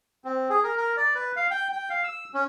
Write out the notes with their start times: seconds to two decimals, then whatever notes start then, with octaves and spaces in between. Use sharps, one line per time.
0.25 C4
0.50 G#4
0.64 A#4
0.77 A#4
0.97 D5
1.15 B4
1.36 F5
1.51 G5
1.72 G5
1.90 F5
2.04 E6
2.34 C#4